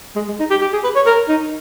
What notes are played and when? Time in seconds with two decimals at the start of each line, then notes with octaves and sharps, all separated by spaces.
0.16 G#3
0.28 G#3
0.40 D#4
0.50 G4
0.61 G4
0.73 G#4
0.84 B4
0.96 C#5
1.06 A#4
1.29 D#4